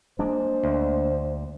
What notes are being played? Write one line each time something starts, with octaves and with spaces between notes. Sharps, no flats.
G#3 A#3 D4 C5
D2